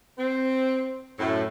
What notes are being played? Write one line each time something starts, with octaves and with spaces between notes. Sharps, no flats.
C4
F#2 A2